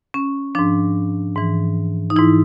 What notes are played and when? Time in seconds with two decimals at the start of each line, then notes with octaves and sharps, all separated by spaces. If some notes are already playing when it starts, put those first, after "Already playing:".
0.14 C#4
0.55 G#2 F3 D4
1.36 G#2 E3
2.10 D#4
2.16 G#2 E3 E4